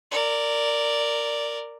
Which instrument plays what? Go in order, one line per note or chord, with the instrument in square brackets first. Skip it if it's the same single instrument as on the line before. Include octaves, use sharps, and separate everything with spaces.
[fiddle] A#4 D5